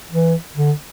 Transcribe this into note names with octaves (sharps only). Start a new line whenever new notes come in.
E3
D3